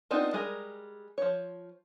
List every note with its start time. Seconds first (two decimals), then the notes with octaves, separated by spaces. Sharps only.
0.11 B3 C4 D4 D#4 F4
0.33 G3 G#3 G#4 A#4
1.18 F3 C#5